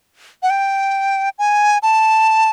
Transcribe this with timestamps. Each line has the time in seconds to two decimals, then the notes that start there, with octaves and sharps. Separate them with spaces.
0.43 F#5
0.50 G5
1.38 G#5
1.83 A5